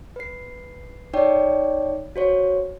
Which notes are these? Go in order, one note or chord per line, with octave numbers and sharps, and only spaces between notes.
B4 C7
D#4 C#5 D5 G5
F#4 C5 C#5